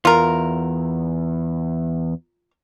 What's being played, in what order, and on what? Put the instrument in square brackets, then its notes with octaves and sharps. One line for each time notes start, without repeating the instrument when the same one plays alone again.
[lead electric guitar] E2 [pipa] F4 A#4